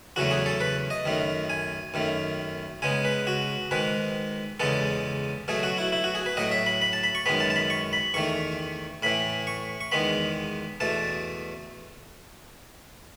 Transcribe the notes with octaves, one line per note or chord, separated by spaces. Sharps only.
E2 C#3 F#3 A3 F#4
G#4
A4
B4
D#5
F#2 D#3 A3
G#5
F#2 D#3 A3
C#3 G#3 B3 G#5
B4
F#4
G#2 D#3 G#3 B4
E2 C#3 G#3 B3 A4
B2 F#3 A3 G#4
F#4
E4
E4
F#4
G#4
B4
A2 F#3 A3 D#5
E5
B5
B5
A5
B5
C#6
F#2 D#3 G#3 B3 B5
A5
A5
B5
C#6
B5
E2 D#3 A3 C#6
A2 E3 A3 B5
C#6
C#6
E2 D#3 G#3 B3 B5
E2 B2 A3 A5